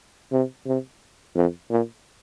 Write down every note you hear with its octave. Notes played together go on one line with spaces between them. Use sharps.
C3
C3
F2
A#2